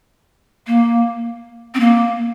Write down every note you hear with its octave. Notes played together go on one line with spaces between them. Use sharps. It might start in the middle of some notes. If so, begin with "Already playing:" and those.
A#3
C4
A#3